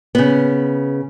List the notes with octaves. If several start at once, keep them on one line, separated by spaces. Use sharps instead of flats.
C#3 B3